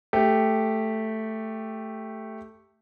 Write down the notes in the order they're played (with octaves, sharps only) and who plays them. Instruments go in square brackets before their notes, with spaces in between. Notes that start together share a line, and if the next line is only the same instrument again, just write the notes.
[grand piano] A3 G4